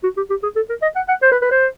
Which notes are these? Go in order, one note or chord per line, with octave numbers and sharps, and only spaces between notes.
F#4
G4
G4
G#4
A4
A#4
D#5
F#5
F#5
C5
B4
B4
C5